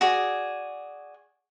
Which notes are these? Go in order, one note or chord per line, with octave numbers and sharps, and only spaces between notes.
F#4 G#4 D5